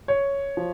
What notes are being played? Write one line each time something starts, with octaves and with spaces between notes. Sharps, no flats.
C#5
F3